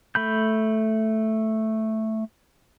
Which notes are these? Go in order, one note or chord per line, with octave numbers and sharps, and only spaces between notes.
A3 B5 G6